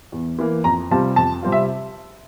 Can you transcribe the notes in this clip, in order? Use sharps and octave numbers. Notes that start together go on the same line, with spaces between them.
E2
E3 A#3
F2 A#5
C3 G3 C4 F4 A5
F2 A5
C3 G3 C4 F4
E5